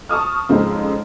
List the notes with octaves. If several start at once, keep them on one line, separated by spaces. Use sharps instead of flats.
A5 C#6 D#6 F6
F2 G#2 C#3 C4